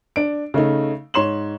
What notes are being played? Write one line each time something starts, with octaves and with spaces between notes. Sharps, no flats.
D4 D7
C#3 A3 D#4
G#2 C#5 C6 E7 F#7